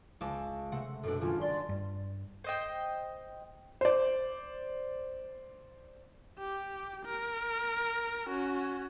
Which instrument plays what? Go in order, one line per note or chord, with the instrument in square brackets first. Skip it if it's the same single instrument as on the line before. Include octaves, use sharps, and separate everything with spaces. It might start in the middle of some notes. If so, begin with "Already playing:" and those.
[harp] C#2 A5 D6
C3 A3 F#5
[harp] F#2 B2 D4 [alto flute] A4
[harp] G#1 G3 C#4 [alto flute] F4
[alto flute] D5 [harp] C6
[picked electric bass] G2
[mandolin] C5 D#5 G5
[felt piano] C5 D5
[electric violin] G4
A#4
C#4 F#4